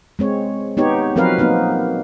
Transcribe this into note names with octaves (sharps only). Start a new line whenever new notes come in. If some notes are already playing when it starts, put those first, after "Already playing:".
G#3 C4 C#5
B3 D#4 G4 C#5
F3 F#3 C4 A#4 B4 F5
A#3 B3 D#4